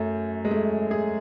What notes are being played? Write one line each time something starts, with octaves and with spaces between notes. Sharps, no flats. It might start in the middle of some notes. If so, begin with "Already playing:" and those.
Already playing: F#2 A3
G#3
A3
G#4